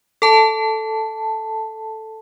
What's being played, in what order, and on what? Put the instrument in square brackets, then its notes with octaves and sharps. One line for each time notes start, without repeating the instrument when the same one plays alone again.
[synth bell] A4 A5